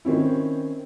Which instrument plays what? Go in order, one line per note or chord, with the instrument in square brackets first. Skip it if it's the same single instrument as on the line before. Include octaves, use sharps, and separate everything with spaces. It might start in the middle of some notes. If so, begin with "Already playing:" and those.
[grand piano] D#3 C4 C#4 E4